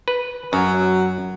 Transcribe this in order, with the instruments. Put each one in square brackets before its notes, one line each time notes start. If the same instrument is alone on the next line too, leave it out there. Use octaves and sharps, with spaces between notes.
[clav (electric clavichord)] B4
[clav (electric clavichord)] F#2 [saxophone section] F#3